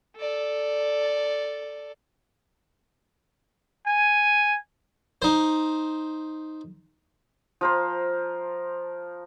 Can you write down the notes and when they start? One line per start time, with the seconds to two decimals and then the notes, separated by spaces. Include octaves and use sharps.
0.17 A4 D5
3.87 G#5
5.22 D#4 C5
7.61 F3 A#4 C5